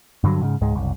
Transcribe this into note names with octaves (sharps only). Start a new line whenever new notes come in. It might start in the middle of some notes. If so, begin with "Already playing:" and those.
G2 D3 D#3 F#3
G#2 C#3
C#2 G#2 G#3
F#1 C2